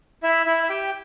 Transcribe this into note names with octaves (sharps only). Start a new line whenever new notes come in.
E4 E5
E4 E5
E5
G4 G5